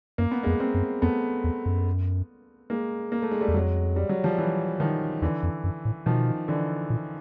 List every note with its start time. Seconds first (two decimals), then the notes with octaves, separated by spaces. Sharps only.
0.18 F#2 A#3
0.31 B3
0.43 F2 G#3 A#3
0.60 A#3 C4
0.74 F#2
1.02 F2 A3 B3
1.44 E2
1.66 F#2
2.70 G#3 A#3
3.12 A#3
3.22 A3
3.32 G#3
3.41 G3 A3
3.48 E2
3.54 F2 F#3 G#3
3.96 G3
4.09 F#3
4.24 F3 G3
4.38 E3 F#3
4.80 D#3 F3
5.22 E2 D3 E3
5.43 F2
5.64 F#2
5.85 A2
6.06 B2 D#3 F3
6.48 D3 E3
6.90 A#2